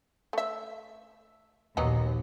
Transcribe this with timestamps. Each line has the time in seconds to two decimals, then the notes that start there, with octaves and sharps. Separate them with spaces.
0.33 A3 E5
1.77 A#1 D#2 F#3 B3 D#4